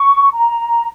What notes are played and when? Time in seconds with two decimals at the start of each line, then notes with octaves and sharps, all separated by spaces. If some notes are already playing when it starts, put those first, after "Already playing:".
Already playing: C#6
0.33 A#5